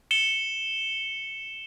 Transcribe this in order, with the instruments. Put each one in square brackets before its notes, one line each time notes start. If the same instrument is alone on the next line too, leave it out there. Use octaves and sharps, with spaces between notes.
[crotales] C#7 E7 G7